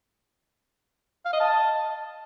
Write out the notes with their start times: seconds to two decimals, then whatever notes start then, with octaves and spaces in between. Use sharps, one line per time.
1.25 F5
1.33 D#5
1.40 A5